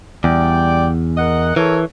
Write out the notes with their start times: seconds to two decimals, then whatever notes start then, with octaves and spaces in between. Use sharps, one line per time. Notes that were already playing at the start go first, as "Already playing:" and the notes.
0.24 E2 G3 D5 G5
1.18 A#4 D#5 F#5
1.56 E3 A4 A#4 C#5